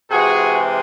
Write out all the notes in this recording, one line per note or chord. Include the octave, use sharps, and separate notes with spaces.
C3 E3 G#3 F#4 G#4